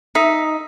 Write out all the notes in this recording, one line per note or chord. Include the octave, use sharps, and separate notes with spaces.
D#4 E5